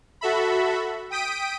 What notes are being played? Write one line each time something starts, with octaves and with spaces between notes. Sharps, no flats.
F#4 A4 E5 B5
G5 D#6 B6 D7 D#7